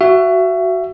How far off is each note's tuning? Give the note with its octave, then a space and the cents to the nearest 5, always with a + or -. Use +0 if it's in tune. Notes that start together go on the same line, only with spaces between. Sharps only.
F#4 +10 E5 +30